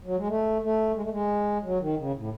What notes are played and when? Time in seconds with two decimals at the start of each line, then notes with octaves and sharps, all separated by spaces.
0.04 F#3
0.16 G#3
0.28 A3
0.62 A3
0.95 G#3
1.02 A3
1.10 G#3
1.63 F#3
1.80 D#3
1.97 C#3
2.14 A2